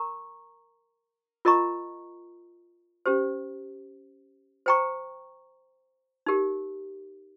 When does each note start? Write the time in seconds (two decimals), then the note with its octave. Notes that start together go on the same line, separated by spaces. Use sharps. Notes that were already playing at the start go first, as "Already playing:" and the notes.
Already playing: A#4 A#5 C#6
1.45 F4 A#4 D#5 A#5 C#6
3.06 C#4 G4 C5
4.66 C5 G5 A#5 C#6
6.26 D#4 G4 A#4